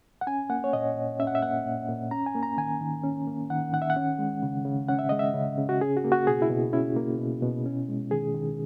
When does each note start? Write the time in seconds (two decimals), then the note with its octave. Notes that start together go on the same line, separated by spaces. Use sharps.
0.21 F#5
0.27 C#4 G#5
0.50 A#3 F#5
0.64 C#5
0.73 A#2 D#5
0.96 A#2
1.19 C#4 E5
1.27 F#5
1.35 E5
1.42 A#3 F#5
1.66 A#2
1.89 A#2
2.11 C#4 A#5
2.26 G#5
2.35 A#3
2.43 A#5
2.57 D#3 G#5
2.81 D#3
3.04 C#4
3.27 A#3
3.50 D#3 F#5
3.73 D#3 F#5
3.82 E5
3.90 F#5
3.96 C#4
4.19 G#3
4.43 C#3
4.65 C#3
4.89 C#4 F#5
4.99 E5
5.09 G#3 D#5
5.19 E5
5.34 C#3
5.58 C#3
5.69 F#4
5.81 C#4 G#4
5.97 F#4
6.04 A#3
6.12 F#4
6.27 B2 G#4
6.42 E4
6.50 B2
6.73 C#4 E4
6.96 A#3
7.19 B2
7.42 B2
7.66 C#4
7.88 G#3
8.11 D#3 G#4
8.35 D#3